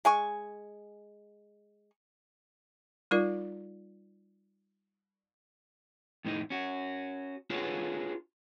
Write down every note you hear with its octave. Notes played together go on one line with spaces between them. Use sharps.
G#3 G#5 C#6
G3 D#4 F4 A#4 D5
F2 A2 C#4 D#4
C#4 F#4
D4 F4 F#4 G#4 B4 C#5